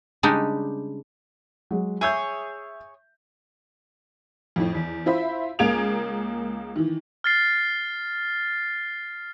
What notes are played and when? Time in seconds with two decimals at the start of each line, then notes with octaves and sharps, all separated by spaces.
0.23 C#3 G3 G#3 D4 D#4
1.71 F#3 G#3
2.01 G#4 C#5 E5 E6 G6
4.56 F2 A2
4.75 E2
5.06 E4 F4 C5 E5 B5
5.59 C#2 A#3 G#4 G#6 D7 F7
6.76 D#3 E3
7.24 F6 A6 C7